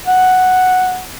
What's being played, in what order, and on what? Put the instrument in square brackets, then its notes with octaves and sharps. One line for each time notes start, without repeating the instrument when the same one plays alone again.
[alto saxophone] F#5